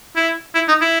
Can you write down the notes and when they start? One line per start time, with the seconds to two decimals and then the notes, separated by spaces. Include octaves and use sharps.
0.16 E4
0.55 E4
0.68 D#4
0.81 E4